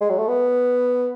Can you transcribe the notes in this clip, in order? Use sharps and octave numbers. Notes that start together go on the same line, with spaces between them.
G#3
F#3
A3
B3